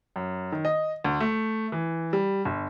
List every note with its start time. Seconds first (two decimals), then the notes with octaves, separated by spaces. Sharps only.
0.16 F#2
0.52 D#3
0.65 D#5
1.04 D2
1.20 A3
1.72 E3
2.13 G3
2.45 G1